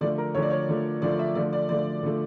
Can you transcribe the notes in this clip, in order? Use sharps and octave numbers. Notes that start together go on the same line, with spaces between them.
D3 F3 A3 D5
A#4
D3 F3 A3 C#5
D5
C#5
D3 F3 A3
D3 F3 A3 D5
E5
D3 F3 A3 D5
D5
D3 F3 A3 D5
D3 F3 A3